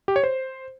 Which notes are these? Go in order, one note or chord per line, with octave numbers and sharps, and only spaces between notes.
G4
C#5
C5